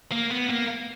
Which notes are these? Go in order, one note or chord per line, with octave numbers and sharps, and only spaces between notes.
A#3
B3
A#3